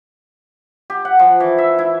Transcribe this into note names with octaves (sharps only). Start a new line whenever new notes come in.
G4
F#5
F3
E3
E5
E4